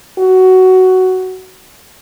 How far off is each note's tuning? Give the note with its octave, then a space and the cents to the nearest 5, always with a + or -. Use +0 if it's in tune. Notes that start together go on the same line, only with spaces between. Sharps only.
F#4 +10